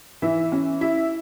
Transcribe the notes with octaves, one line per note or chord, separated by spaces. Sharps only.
E3 E5
C#4
E4 E5